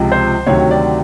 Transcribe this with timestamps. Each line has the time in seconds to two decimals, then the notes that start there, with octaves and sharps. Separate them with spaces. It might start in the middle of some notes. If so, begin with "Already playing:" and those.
Already playing: C#2 C3 F3
0.12 C5
0.47 D2 C3 D#3 F#3 C#5
0.71 D5